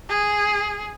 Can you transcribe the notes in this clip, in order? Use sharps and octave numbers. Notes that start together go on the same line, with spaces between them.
G#4